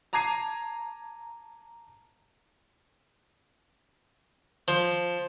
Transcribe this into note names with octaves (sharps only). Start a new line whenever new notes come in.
A5 A#5 D6 G#6 C7 D#7
F3